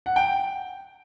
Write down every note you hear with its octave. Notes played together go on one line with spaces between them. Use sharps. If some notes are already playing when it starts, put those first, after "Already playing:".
F#5
G5